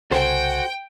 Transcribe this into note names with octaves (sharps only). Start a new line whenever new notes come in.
C2 C#3 F#4 A4 C5 G5 G#5